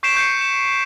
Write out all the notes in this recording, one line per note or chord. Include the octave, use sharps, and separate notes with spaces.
C#6 G6 B6 C7 D7 E7
C#6 G6 C7 C#7
E7